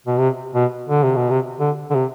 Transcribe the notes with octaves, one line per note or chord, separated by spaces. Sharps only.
B2
C3
B2
D3
C3
B2
C3
D3
D3
C3